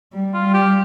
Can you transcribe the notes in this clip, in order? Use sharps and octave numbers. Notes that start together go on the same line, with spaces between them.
G3
F4
G3
G4